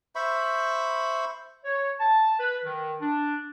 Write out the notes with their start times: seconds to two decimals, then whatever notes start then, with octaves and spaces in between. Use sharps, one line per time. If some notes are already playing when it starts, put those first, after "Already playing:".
0.15 C5 E5 B5 C#6
1.64 C#5
2.00 A5
2.39 B4
2.64 D#3
3.01 D4